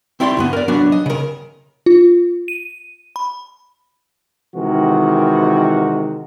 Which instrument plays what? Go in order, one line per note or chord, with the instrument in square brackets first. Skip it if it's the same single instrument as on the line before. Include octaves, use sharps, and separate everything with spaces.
[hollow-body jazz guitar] C4 E4 G4 D5 B5 C6
D2 G2 B3
A#4 D5
F#3 B3 D4 F#4
D#5
C#3 A#4
[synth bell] F4
D#7
B5
[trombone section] C3 D#3 E3 G#3 F#4 A#4